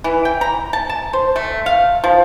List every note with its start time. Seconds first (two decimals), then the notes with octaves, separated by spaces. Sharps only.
0.04 E3
0.25 G5
0.41 A#5
0.73 A5
0.89 A5
1.13 C5
1.36 A3
1.66 F5
2.04 F3